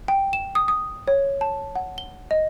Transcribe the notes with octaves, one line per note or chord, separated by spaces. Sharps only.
G5
E7
D#6
D#6
C#5
A5
F#5
G7
D#5